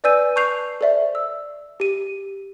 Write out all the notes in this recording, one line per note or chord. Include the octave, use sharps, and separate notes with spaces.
B4 D5 G#5 E6 G6 D#7
A5 C#6 F#6 G6 C7 F7
A4 C5 D5 E5
E6
G4 D#7